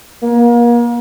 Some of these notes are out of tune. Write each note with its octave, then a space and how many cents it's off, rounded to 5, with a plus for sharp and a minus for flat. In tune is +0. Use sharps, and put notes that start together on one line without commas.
A#3 +35